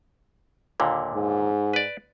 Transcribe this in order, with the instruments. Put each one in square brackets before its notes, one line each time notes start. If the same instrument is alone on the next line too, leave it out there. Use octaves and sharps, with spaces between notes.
[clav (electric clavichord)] D#2 A#2 D3
[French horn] G#2
[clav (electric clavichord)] B4 D5